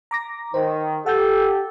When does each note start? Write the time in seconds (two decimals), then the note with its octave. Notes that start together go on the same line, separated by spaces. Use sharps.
0.11 A#5 D6 A#6
0.54 D#3 C5
1.06 G4 A4 F#5 G6